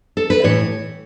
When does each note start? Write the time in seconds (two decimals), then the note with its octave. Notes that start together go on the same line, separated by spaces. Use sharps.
0.17 A4
0.30 B4
0.44 A2 E3 C#5